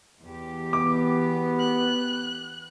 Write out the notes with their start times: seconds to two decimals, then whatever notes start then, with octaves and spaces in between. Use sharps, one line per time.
0.21 E2 G4
0.73 B3 D6
1.59 F#6